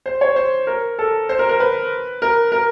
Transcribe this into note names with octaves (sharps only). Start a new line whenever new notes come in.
C5
C#5
C5
A#4
A4
C5
A#4
A#4
B4
A#4
A#4